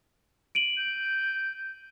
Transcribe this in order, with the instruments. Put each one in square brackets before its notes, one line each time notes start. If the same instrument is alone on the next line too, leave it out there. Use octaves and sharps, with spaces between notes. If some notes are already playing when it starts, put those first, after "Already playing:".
[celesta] D7 D#7 F#7
[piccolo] G6